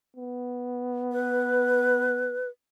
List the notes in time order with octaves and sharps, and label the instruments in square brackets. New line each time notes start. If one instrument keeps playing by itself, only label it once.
[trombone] B3
[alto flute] B4